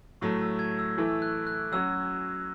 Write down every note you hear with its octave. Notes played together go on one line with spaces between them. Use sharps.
A2 F#3 A3 C#6
E6
G#6
E6
E3 A3 E4
F#6
F#6
F#3 C#4 F#4 E6